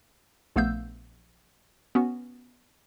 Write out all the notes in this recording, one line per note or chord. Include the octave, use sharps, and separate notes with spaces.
A#1 A3 B3 F5 E6 G6
B3 C#4 F#4